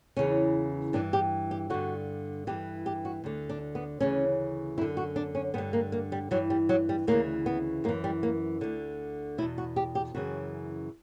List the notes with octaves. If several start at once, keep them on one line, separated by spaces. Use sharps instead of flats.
E2 C#3 E3 C#4
G2 E3 D4
G4
G4
G2 D3 F#4
G2 E3 G4
G4
F#4
D2 D3
D4
B3
D2 C#3 E3 C#4
F#2 D3 E4
F#4
D4
C#4
G2 D3 B3
A#3
A#3
G3
G2 E3 F#3
G3
F#3
G3
D2 C#3 E3 A#3
B3
F#2 E3 A#3
G3
A#3
D2 D3
E2 B2 E4
F#4
G4
G4
F#2 C#3 E3 F#4